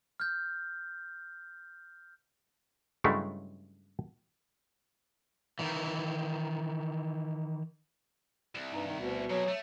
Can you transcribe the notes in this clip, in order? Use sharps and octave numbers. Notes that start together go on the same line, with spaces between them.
F6 G6
G2 C#3 F#3 G#3 A3 E4
D#3 E3
C2
G2 D#4
D#3
D2 B2
C3 F#3 G#4
A3